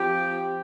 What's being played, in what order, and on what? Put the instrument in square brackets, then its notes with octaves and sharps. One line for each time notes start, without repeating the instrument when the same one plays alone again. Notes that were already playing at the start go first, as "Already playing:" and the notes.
Already playing: [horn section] F3 C4 G4